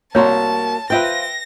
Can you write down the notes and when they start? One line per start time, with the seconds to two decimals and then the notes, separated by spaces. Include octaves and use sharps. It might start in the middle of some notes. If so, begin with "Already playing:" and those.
0.15 C2 A#3 F#4 C#5 D5 A5 A#5 C6
0.90 F4 B4 C5 E5 G5 A#6